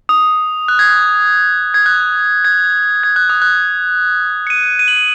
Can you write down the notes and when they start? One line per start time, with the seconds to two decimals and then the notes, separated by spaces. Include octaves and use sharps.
0.09 D#6
0.68 F#6
0.79 G#6
0.89 F#6
1.74 G#6
1.86 F#6
2.45 G#6
3.03 G#6
3.16 F#6
3.30 D#6
3.42 F#6
4.47 C#7
4.50 D#7
4.79 D#7
4.88 F#7
4.96 D#7